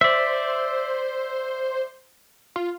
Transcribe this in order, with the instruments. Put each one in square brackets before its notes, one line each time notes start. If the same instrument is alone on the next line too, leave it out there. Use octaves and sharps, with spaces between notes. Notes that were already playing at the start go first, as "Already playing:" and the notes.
[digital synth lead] C5 [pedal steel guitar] D5 E5
[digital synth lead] F4